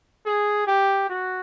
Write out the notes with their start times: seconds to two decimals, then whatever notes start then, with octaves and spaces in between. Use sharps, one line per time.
0.26 G#4
0.67 G4
1.10 F#4